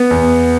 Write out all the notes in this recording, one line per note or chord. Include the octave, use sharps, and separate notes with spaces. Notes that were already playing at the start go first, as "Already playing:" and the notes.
Already playing: B3
E2